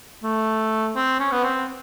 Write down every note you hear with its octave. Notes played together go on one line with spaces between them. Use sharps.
A3
C4
C#4
B3
C4